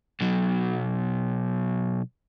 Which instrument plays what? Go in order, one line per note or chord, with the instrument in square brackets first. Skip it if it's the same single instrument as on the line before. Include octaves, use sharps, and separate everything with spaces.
[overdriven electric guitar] B1 F#3